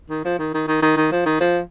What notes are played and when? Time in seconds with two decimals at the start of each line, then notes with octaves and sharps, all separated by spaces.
0.10 D#3
0.25 F3
0.39 D#3
0.54 D#3
0.68 D#3
0.82 D#3
0.97 D#3
1.12 F3
1.26 D#3
1.40 F3